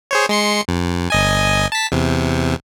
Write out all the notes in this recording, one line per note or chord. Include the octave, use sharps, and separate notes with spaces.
G#4 C5 C#5
G#3 C6 C#7
F2
G1 D#5 G#5
A5 B6
E2 C3